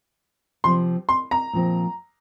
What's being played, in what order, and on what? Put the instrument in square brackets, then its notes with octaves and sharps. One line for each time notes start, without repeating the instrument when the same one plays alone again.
[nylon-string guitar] C3 F3 C4 [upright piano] C6
[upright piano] C6
A#5
[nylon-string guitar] A#2 F3 C4